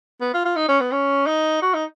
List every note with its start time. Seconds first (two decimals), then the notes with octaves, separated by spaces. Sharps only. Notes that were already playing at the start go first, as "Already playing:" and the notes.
0.21 B3
0.34 F4
0.45 F4
0.56 D#4
0.69 C#4
0.81 B3
0.92 C#4
1.27 D#4
1.62 F#4
1.74 D#4